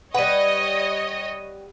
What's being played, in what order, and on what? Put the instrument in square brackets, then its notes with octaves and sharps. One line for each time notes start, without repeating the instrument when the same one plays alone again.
[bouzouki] G3 B4 [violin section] C#5 D#5 [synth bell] F#5 D#7